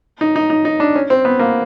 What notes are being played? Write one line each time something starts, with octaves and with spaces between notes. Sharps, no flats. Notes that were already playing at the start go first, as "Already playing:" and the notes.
D#4
D#4
D#4
D#4
D4
C#4
C4
B3
A#3